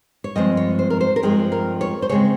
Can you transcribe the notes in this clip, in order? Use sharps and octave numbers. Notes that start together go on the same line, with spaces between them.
C#5
G2 F3 G#3 C4 D#5
C#5
C5
A#4
C5
A#4
G2 F3 G#3 C4 G#4
A#4
C#5
C5
C#3 G#3 C4 C#5